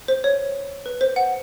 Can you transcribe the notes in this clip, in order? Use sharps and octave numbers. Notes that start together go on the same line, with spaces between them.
C5
C#5
B4
C5
F#5